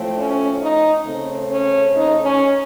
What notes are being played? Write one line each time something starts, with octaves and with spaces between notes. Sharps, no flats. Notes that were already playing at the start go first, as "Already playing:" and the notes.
Already playing: A2 F3 A3 C4
C#4
D#4
C#3 A3 C4
C#4
D#4
C#4